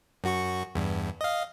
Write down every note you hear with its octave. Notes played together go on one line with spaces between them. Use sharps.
F#2 F#4 C#6
E2 G2
D#5 F5